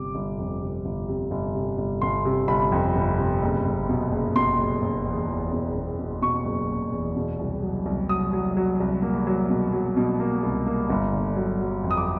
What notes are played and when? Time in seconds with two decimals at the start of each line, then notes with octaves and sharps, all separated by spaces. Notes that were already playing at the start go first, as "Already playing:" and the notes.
Already playing: G1 C3 D6
0.15 G1
0.38 F2
0.62 C3
0.85 G1
1.08 C3
1.31 G1
1.55 C3
1.78 G1
2.02 G1 C6
2.25 C3
2.48 G1 B5
2.72 F2
2.95 G1
3.18 C3
3.42 F#1
3.65 F#1
3.89 B2
4.12 F#1
4.35 B2 C6
4.58 F#1
4.82 F#1
5.06 E2
5.29 E2
5.52 B2
5.75 B2
5.99 B2
6.22 B2 C#6
6.45 F#1
6.69 F#1
6.92 E2
7.16 B2
7.39 C2
7.63 F#3
7.86 C2
8.09 F#3 D#6
8.33 F#3
8.57 F#3
8.80 C2
9.02 A#3
9.27 F#3
9.49 B2
9.73 F#3
9.97 B2
10.20 A#3
10.43 C2
10.66 A#3
10.90 G1
11.13 D3
11.36 F#3
11.60 F#3
11.84 F2
11.91 D#6
11.97 D6